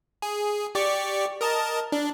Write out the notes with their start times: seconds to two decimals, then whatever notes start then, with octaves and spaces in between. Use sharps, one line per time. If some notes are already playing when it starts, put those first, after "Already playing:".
0.22 G#4
0.75 G4 D5 C#6
1.41 A#4 D#5 A5
1.92 D4